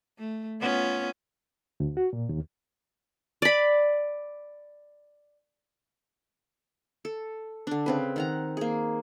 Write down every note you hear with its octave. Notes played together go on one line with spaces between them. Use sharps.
A3
B3 C#4 F4
D2
F#4
A#2
D#2
D5 B5
A4
D3 D4
C#3 C4 B4
D#3 F#5 A#5
A#3 G#4